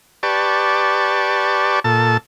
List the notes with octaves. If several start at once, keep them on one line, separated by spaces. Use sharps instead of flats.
G4 B4 D5 A5 C#6
A#2 A4 A5